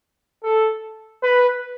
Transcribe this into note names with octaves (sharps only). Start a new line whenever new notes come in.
A4
B4